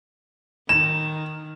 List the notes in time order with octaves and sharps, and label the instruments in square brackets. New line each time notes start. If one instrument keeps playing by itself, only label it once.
[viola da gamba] D#3 [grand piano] E7